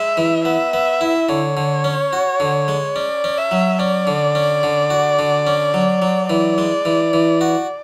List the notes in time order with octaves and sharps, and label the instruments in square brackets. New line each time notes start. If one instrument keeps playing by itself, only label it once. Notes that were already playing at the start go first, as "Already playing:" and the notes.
Already playing: [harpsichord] G#3 [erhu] E5
[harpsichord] E3
[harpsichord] B3 [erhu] E5
[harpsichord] B3
E4
[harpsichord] D3 [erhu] C#5
[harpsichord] D3
C#4
F#4
D3
G#3
[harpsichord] C#4 [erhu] D5
[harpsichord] C#4
[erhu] E5
[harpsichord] F#3
[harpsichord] C#4 [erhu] D5
[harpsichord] D3
C#4
D3
F#4
D3
C#4
F#3
F#3
[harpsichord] E3 [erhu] D5
[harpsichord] G#3
E3
E3
F#4